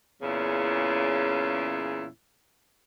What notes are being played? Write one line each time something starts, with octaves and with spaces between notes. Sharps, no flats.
E2 A#2 C#3 C#4 E4